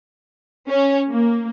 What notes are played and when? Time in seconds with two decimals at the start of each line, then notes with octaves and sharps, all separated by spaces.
0.68 C#4
1.08 A#3